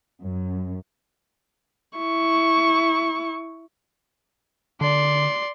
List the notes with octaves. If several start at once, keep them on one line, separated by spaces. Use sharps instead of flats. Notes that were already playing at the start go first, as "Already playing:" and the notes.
F#2
E4 C#6
D3 D5 C6